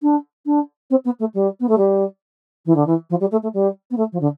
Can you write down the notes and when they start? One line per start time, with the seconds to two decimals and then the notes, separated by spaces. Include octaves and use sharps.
0.02 D4
0.46 D4
0.90 C4
1.05 B3
1.19 A3
1.34 G3
1.60 B3
1.68 A3
1.77 G3
2.65 E3
2.75 D3
2.86 E3
3.10 F3
3.20 G3
3.31 A3
3.42 A3
3.53 G3
3.90 B3
3.97 A3
4.12 F3
4.20 D3